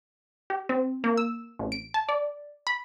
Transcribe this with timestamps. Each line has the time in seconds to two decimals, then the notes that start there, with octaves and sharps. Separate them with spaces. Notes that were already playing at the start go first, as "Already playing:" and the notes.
0.50 G4
0.69 C4
1.04 A#3
1.17 E6
1.59 A1
1.72 D7
1.94 A5
2.09 D5
2.67 B5